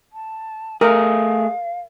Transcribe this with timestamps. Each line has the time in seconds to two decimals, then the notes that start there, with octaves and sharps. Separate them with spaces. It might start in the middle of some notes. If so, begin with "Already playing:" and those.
0.12 A5
0.81 A3 G#4 A#4 F5